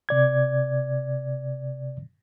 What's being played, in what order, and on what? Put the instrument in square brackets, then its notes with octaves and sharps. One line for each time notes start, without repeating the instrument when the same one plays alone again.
[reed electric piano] C3 D5 G#6